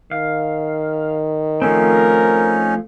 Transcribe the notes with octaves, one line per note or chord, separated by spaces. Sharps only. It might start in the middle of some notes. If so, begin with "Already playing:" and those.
D#3 F5
F3 A3 C4 C#4 D#4 A#4